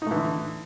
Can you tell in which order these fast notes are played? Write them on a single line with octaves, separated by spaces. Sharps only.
D#4 A3 E3 D3